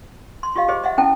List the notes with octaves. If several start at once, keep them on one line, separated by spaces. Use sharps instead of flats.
C6
F4 G4 D#5 F5
G4 G#4 C5 D#5
D#5 E5 F#5
C#4 E4 A4 G5 A5